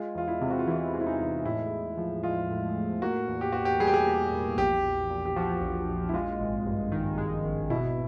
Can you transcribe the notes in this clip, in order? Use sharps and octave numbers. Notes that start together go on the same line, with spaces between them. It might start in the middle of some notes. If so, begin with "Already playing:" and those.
Already playing: G#3 F4
E2 F4
E4
C3
F#4
F4
E3 E4
G#3
E4
D#4
E2
A2 E4
A2
F3
G#3 F4
A2
A2
A#3 F#4
E2
G4
B2 F#4
G4
G3 G#4
G4
G#4
A#3
E2
A#1 G4
A#1
A#2
G4
F3 F#4
A#1
A#1
E4
G#3 F4
G#1
G2
D#3
G#3
G#1
B2 E4